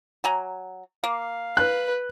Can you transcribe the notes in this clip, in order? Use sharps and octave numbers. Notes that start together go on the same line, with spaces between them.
F#3 G#5 A#5
A#3 F5
B4 F#6